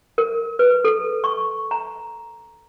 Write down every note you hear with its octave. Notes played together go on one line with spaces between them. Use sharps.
A#4
B4
A4
C#6
A#5